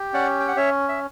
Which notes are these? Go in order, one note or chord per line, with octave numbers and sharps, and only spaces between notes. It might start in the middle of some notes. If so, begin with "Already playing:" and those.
Already playing: G4
C#4 D5 F#5
G5
F#5
C#4 C#5 E5
E5